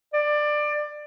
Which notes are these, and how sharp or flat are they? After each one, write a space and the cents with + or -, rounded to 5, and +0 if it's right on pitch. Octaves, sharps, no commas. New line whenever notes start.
D5 +20